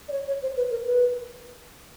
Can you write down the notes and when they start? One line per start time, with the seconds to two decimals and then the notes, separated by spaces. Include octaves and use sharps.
0.09 D5
0.12 C#5
0.28 C#5
0.42 C5
0.56 B4
0.71 A#4
0.86 B4